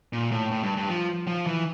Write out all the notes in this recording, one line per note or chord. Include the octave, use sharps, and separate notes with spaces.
A#2
A2
A2
G2
G2
F3
F3
E3